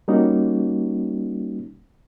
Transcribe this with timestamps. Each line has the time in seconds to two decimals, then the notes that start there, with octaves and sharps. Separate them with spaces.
0.08 G3 A#3 C#4 D#4 F#4